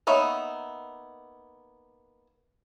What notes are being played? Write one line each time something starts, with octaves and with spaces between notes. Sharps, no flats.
A#3 B3 D#4 C#5 E5